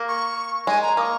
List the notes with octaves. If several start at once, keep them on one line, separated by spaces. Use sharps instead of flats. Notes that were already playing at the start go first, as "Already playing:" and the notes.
Already playing: A#3
C#6
G#3 G#5
A#5
A#3 C#6 D#6